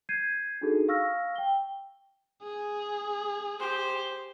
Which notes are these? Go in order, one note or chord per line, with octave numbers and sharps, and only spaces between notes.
G6 G#6 C7 D#7
D4 D#4 F#4 G#4 A4
F5 C#6 E6 F6 A#6
G5 G7
G#4
G4 C5